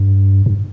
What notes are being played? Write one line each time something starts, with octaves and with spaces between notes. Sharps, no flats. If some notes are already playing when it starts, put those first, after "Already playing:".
Already playing: G2
G2